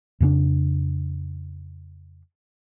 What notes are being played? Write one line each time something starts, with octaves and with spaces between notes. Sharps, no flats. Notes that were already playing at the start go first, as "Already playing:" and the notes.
F2 C#3 A#3 D4